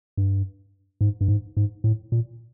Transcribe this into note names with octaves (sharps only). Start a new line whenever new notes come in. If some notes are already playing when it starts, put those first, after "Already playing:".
G2
G#2
G2
G#2
G#2
A2
A#2